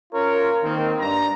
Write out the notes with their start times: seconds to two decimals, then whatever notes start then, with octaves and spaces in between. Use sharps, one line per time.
0.13 C#4 F4 A#4 C#5
0.63 D#3 A#3 C4
1.00 G2 D4 A#5